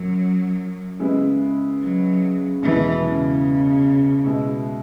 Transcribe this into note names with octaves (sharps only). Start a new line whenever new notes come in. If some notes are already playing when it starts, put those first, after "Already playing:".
Already playing: F#2 F#3
C#3 G#3 B3 E4
F#3
E2 B2 E3 G#3
C#3
B2 G#3 E4